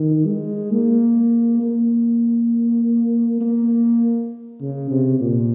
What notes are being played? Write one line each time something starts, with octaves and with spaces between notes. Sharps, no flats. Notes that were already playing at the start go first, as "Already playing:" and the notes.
Already playing: D#3
G#3
A#3
A#3
A#3
C#3
C3
A#2